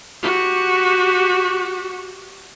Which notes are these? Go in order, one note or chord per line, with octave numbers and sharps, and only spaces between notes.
F#4 G4